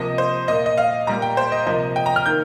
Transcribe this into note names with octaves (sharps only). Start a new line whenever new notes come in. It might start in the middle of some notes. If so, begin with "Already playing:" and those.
Already playing: C3 F3 A#3 D#5
C5
A#2 A#3 D#5
D#5
F5
A#2 G3 A#3 A#5
G5
C5
D#5
C3 F3 A#3 D#5
G5
A#5
F6
D#3 A#3 G6